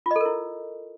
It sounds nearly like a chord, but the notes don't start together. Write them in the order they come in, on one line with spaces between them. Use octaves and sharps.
F4 D#5 A4 A#4 E4